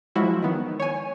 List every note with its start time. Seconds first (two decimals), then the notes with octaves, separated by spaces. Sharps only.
0.16 F3 F#3 G#3 E4 F#4
0.42 D#3 B3
0.80 C#5 G#5